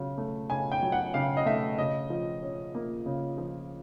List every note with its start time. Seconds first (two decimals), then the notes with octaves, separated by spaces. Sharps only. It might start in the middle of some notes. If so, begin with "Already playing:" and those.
Already playing: C#3 F#3
0.18 A3
0.50 C#3 G#5
0.72 G5
0.83 F#3
0.92 F#5
1.14 C#3 F5
1.37 D#5
1.46 A3 E5
1.78 C#3 D#5
2.10 F3
2.43 C#4
2.75 A#3
3.06 C#3
3.38 F3